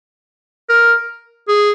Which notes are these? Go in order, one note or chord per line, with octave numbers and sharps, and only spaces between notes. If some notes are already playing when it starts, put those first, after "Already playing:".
A#4
G#4